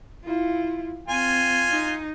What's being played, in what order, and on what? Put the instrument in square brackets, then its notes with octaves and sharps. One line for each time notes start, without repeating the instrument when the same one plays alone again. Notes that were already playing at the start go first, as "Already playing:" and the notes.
[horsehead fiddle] E4 F4
[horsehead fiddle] C4 [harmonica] F4 G#5
[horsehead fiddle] D#4